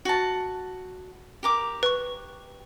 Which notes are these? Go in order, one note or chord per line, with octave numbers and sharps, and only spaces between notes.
F#4 A5
G4 A#4 D6
B4 C#6